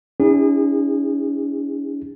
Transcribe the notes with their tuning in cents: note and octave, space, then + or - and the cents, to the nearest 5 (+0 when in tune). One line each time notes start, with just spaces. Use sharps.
C#4 +35 E4 -40 G#4 -35